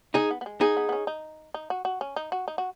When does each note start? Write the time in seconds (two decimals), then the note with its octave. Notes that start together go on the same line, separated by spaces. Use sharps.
0.14 G#3 D#4 G#4
0.31 B3
0.41 B3
0.46 G#3
0.61 B3 D#4 G#4
0.77 B3
0.89 B3
0.92 C#4
1.07 D#4
1.54 D#4
1.70 F#4
1.85 F#4
2.01 C#4
2.16 D#4
2.32 F#4
2.48 D#4
2.58 F#4